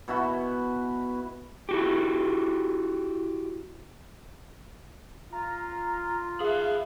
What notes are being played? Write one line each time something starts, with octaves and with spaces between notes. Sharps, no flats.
B2 E4 F#4
E4 F#4 G4
F4 A#5
G#4 E5 F5